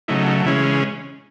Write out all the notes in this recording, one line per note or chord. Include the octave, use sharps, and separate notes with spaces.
C#3 F#3 A3 D#4 E4
D#4
C#3 E3 G#3 C#4 E4